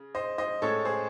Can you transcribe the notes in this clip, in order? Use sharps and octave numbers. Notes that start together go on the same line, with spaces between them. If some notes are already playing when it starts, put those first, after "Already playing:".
Already playing: C#3
C5 D#5
C5 D#5
A2 G#3 C#4 A4 C#5
G#4 C5